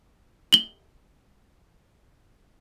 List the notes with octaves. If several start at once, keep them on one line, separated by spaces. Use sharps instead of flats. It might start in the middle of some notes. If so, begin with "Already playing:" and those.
F#7 G7